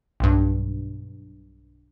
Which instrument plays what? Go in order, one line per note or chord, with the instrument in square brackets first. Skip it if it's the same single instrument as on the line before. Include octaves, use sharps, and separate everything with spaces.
[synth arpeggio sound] B1 G2